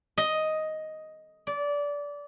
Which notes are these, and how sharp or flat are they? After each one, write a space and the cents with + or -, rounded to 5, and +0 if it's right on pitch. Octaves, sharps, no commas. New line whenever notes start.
D#5 +5
D5 -20